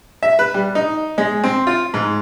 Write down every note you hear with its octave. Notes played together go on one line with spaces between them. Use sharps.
E5
B4
G3
D#4
G#3
C4
F4
G#2